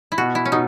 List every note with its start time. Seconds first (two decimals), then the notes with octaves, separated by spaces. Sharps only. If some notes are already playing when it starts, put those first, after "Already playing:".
0.12 E4
0.18 B2 F#4
0.35 E4
0.45 C#4
0.52 B2 D#4